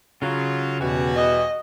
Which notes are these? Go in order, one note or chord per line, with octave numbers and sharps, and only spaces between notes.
C#3 F#3 F4
E2 B2 E3 G3 F#4
D#5